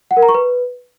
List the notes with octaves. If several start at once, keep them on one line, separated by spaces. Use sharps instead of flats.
F#5
A#4
A#5
C#6
B4